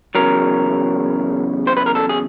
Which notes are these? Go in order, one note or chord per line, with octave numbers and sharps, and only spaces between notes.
E2 C#3 F#3 A#4
C5
B4
A#4
A4
G#4